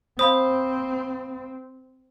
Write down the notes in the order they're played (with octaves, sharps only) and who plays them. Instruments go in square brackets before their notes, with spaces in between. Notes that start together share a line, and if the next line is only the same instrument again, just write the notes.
[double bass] C4 [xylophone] C5 [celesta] F5 B5 D#6